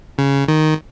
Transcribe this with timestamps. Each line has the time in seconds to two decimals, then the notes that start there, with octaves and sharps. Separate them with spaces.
0.18 C#3
0.48 D#3